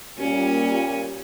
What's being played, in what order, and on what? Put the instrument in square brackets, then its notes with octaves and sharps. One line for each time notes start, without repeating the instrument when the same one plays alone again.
[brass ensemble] A#2 G3 [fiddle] C#4